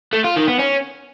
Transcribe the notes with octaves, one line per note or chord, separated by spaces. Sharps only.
A3
F4
D#3
B3
C#4